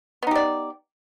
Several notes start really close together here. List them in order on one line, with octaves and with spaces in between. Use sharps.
B3 D#4 G4 D5